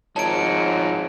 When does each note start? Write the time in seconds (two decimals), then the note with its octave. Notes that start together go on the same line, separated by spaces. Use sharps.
0.16 G#1 F3 D#4 C#5 A5 D7